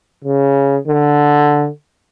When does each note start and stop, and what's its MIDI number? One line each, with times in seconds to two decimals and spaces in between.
0.24 0.77 49
0.87 1.67 50